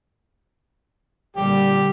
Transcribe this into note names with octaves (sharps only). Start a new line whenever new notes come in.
A#2 D3 G3 G4